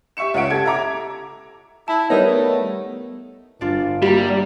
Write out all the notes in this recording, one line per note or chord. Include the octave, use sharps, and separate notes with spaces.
G4 E5 C#6 C#7 E7
C#2 C#4 F#5 D7
G4 A4 G#6
E5 A#5 D6
E4 A5
G3 B3 D#4 A#4 C#5
D#3 A3
G1 D4 F4
G3 A#3 F#4 G4 E5 A#5